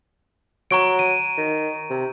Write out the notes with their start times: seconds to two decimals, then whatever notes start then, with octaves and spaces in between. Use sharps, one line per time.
0.71 F#3 A#5 C#6 D7
0.99 D#7
1.37 D#3
1.90 C3